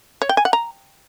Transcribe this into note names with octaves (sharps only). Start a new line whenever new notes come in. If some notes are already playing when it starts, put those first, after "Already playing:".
C#5
G5
G#5
F#5
A#5